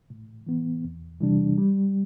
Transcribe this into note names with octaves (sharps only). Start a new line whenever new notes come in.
A2
E3 B3
E2
C3 E3 G3 D4
G3